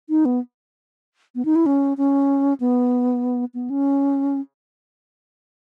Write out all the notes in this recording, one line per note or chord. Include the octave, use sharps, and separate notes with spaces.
D#4
B3
B3
D#4
E4
C#4
C#4
B3
B3
C#4